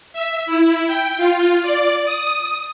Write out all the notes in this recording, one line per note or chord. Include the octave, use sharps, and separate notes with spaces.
E5
E4
G5
F4
D5
D#6